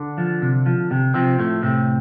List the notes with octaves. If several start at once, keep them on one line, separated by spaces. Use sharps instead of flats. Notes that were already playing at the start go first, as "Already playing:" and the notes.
Already playing: D3 D4
F3
C3
F3
C3
C3 F3 C4
A2 A3
A2 C3 C4